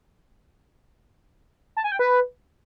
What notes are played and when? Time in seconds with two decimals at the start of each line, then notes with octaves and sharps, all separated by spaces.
1.77 A5
1.84 G#5
1.92 G5
1.99 B4